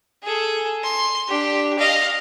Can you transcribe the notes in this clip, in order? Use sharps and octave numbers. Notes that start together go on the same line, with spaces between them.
G#4 A4
C6
D4 G4
D#5 F5